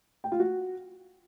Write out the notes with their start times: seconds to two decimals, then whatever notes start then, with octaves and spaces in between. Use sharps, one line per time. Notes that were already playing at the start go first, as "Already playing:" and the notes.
0.24 G5
0.32 F4
0.40 F#4